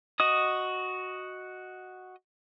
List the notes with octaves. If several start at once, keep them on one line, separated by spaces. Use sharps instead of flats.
F#4 D#5 D#6